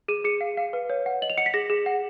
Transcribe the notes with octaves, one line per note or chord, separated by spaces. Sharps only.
G#4 D#7
G#4 C#7
F5
F5
B4
C#5
F#5
D#5 F#7
F7
F#5 C#7
B6
G#4 A#6
G#4
F#5